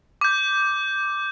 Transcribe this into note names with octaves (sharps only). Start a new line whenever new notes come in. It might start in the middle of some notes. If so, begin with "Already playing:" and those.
D6 G6